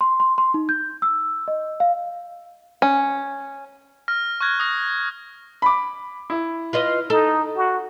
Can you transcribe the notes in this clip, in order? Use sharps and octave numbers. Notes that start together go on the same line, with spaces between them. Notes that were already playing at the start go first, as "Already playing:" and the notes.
C6
C6
C6
D#4
G6
E6
D#5
F5
C#4
F6 A#6
C#6 F6 F#6 G#6 A#6
D#6 A#6
B5 D6
E4
F4 B4 D#5
D#4 A4
F#4